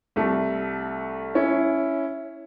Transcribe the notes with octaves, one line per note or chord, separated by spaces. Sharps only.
C2 A3
C#4 E4